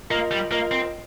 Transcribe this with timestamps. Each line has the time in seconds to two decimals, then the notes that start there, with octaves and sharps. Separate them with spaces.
0.10 A#3 F4 A#4 D#5
0.31 G3
0.51 A#3 F4 A#4 D#5
0.72 C4